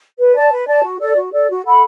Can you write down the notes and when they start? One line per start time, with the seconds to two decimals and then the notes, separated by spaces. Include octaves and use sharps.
0.18 B4
0.35 D5 A5
0.51 B4
0.67 D5 A5
0.84 F#4
1.00 A4 D5
1.16 F#4
1.32 A4 D5
1.49 F#4
1.65 A4 F#5 B5